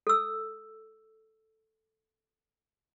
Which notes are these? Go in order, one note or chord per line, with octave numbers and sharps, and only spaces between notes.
A4 E6